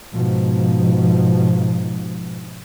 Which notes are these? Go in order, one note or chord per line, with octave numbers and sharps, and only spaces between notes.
G#2 B2 F3